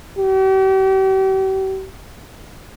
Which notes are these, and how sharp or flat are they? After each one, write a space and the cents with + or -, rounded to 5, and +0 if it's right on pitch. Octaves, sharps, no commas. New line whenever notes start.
G4 -40